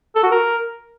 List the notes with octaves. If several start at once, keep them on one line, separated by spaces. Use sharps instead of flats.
A4
F#4
A#4